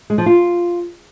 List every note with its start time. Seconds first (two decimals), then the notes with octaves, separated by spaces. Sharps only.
0.10 G#3
0.18 F3
0.26 F4